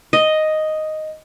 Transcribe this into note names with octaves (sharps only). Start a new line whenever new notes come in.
D#5